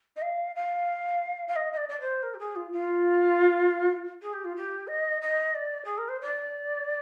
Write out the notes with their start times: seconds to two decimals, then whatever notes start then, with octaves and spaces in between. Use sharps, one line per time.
0.16 D#5
0.21 F5
0.55 F5
1.47 F5
1.55 D#5
1.72 D#5
1.77 D5
1.88 D5
2.00 C5
2.22 A#4
2.34 G4
2.39 G#4
2.55 F4
2.72 F4
4.21 G#4
4.33 G4
4.44 F4
4.56 G4
4.87 D#5
5.21 D#5
5.55 D5
5.84 G#4
5.97 A#4
6.08 C5
6.21 D5